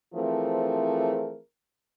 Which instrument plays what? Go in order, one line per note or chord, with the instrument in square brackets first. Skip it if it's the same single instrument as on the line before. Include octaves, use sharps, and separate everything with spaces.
[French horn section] E3 F3 A3 C4 G#4 A#4